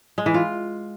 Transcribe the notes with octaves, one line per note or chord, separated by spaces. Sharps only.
G#3
E3
F4